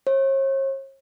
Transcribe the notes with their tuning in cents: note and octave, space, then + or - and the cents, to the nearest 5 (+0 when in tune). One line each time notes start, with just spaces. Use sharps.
C#5 -45